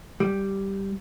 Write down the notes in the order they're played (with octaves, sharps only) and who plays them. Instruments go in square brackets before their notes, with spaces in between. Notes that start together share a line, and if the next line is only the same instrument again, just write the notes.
[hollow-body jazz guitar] G3